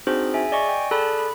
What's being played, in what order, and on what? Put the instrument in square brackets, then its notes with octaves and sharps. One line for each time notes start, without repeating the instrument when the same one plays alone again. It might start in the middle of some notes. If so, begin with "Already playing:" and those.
[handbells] C4 D4 D#4 F#4 G#4 C5
G#4 E5 G#5
D5 D#5 G#5 C#6
G5
G#4 A4 D5 A5 B5 F#6
B5